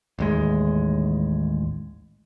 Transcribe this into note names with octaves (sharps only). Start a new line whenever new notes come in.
A1 D#2 G#3